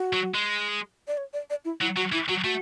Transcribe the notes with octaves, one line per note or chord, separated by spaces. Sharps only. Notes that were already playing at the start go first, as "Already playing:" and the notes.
Already playing: F#4
F#3
G#3
D5
C#5
D5
D5
E4
F#3 E4
F#3 F#4
E3 E4
F#3 F#4
A3 F#4